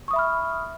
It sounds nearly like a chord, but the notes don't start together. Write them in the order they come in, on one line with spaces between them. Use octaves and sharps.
C#6 D#6 E5 B5 F6